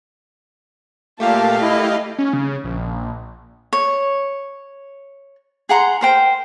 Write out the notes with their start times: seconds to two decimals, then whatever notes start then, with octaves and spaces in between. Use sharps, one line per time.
1.20 A#2 A3 A#3 G4 F5 A5
1.61 E4 D#5
2.19 C#4
2.33 C#3
2.64 A#1
3.73 C#5
5.69 G#4 F#5 A#5 C6
6.01 A#4 C5 G5